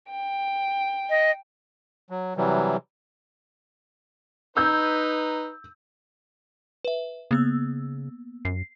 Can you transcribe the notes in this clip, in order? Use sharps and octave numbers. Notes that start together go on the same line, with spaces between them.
G5
D#5
F#3
C3 E3 F#3 G3
D#4 B4 E6 G6
B4 E5
C#3 A#3 B3 E6
F#2 C7